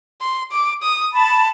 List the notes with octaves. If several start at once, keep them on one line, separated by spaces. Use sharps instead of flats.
C6
D6
D#6
A5 B5